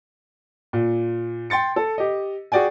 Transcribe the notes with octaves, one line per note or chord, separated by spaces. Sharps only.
A#2
G5 C6 A6 C#7
A4
G4 D#5
F#4 G#4 D5 G5 G#5